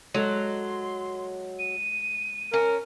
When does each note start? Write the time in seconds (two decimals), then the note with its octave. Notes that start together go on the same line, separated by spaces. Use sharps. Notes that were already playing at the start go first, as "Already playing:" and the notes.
0.14 F#3 G#3 A4 D#5 C6
1.59 D#7
2.53 C#4 A#4